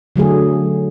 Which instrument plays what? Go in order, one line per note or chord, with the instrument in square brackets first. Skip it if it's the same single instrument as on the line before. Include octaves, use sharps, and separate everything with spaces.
[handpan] D3 F#3 A3 G#4